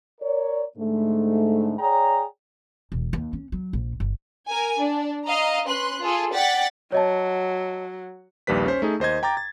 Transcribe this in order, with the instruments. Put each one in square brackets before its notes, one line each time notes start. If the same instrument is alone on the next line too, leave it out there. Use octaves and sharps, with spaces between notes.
[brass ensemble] A#4 C#5 D5
G#2 D3 A3
G#4 C#5 D5 G5 A#5
[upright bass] E1
D#2
C#4
F#3
A#1
G1
[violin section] A#4 G#5
D4
D#5 F5 A#5
C#4 B4 C6 F#6
F4 G#4 A4
D5 F#5 G5 A6 B6
[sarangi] F#3 [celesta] C#5 D#5 A5
[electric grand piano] A#1 D#2 G3 B4 B6
C#4 C5
A3 D#4 G#4
D#2 C5 D#5 G#6
G5 A#5 D6 A6
A6